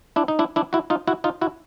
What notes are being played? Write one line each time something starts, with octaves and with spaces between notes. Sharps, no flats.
D4 E4
D#4
D4 E4
D4 E4
E4 F#4
D#4 F4
E4 F#4
D#4 F4
E4 F#4